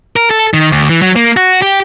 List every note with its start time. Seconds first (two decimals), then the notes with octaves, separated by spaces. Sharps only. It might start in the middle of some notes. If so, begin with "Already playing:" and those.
0.16 A#4
0.30 A4
0.54 D#3
0.72 D2
0.89 E3
1.02 F#3
1.16 A#3
1.37 F#4
1.62 G4